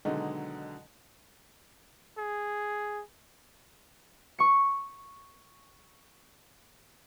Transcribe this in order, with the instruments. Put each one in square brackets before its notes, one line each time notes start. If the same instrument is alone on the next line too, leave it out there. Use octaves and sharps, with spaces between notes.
[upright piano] B2 D3 D#3 F#3 G#3 D#4
[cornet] G#4
[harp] C#6 C#7